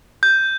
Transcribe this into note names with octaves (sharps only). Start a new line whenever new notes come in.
G6